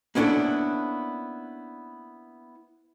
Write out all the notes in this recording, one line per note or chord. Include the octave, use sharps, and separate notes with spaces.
A#3 B3 C#4 D4 E4 A4